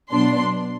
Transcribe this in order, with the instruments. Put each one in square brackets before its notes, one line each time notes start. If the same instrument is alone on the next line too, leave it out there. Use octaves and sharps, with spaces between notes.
[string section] B2 F#3 B3 D4 C6